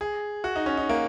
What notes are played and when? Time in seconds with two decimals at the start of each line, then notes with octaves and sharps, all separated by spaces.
0.01 G#4
0.44 F#4
0.56 D#4
0.66 C#4
0.77 D#4
0.89 A#3